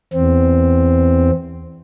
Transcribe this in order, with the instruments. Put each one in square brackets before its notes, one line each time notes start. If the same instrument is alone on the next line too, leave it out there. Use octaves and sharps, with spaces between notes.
[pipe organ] E2 C4